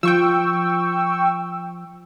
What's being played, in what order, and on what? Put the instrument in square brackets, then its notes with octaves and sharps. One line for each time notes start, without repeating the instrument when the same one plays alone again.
[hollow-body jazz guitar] F3 [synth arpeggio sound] G5 C#6 E6